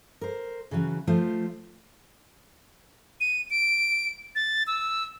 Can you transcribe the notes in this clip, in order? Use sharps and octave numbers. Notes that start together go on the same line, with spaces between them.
A#4 C5
C#3 E3 F#3 C#4
F3 A3 F4 C5
D#7
D7
A6
E6